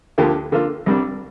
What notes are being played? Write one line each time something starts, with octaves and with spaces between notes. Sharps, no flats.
D2 D3 F3 A#3 G4
D3 A#3 F4
C2 C3 G3 D4